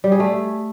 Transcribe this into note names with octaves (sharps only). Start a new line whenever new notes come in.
G3
G#4
A3